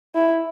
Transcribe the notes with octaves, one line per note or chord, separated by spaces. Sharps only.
E4